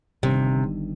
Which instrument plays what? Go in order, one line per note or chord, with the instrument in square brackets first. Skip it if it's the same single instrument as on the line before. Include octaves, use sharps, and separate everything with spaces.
[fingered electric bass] G1 G2 D#3 [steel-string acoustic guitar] C3